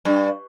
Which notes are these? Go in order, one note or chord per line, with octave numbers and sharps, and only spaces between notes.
G2